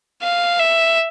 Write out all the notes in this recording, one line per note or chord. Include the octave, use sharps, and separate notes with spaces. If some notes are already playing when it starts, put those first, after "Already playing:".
F5
E5